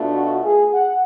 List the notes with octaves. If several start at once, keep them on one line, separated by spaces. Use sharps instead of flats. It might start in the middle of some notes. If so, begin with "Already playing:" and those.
Already playing: B2 A3 D4 F4
F#4
G#4
F#5